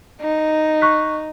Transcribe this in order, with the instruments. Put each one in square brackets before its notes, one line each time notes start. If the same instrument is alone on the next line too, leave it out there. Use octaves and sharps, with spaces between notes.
[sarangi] D#4
[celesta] C#6 F#6 B6